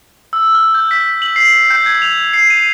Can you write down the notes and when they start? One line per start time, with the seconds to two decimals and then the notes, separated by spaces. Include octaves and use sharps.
0.33 E6
0.55 F6
0.74 G6
0.91 B6
1.22 F#7
1.36 C7
1.70 G6
1.86 G#6
2.02 F7
2.33 C7
2.50 D#7